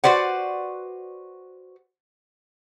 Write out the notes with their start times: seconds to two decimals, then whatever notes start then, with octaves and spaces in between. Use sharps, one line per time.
0.04 F#4 B4 C5 D5 F#5